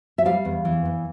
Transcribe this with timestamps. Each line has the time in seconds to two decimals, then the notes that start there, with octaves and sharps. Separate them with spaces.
0.18 E5
0.25 G3 F5
0.45 E2
0.65 E3
0.85 E2